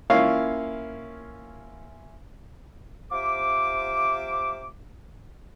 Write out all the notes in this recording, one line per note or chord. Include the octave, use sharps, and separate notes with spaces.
A#3 C#4 E4 F4 C#5 F5
C3 F4 C5 E5 D6